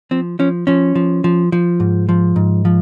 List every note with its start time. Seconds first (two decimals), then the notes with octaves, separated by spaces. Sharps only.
0.11 F3 C4
0.39 F3 C#4
0.67 F3 C#4
0.95 F3
1.24 F3
1.52 F3
1.80 G#2
2.09 F3
2.36 G#2
2.65 F3